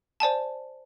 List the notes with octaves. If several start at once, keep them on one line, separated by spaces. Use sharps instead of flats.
C5 D5 G#5 A5